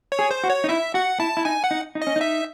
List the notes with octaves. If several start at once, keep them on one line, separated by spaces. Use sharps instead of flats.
C#5
G#4
C5
F#4
C#5
D#4
E4 E5
F#4 F#5
E4 A5
E4
D#4 G#5
F#5
D#4
D#4
D#5
C#4
D#4 E5